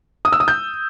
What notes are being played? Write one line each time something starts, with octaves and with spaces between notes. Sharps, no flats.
D#6
E6
D#6
G6